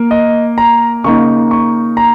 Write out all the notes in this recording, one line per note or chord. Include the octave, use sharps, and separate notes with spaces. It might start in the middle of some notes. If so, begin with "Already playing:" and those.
Already playing: A#3
D#5
A#5
C#3 A#3 D#4 C#6
C#6
A#5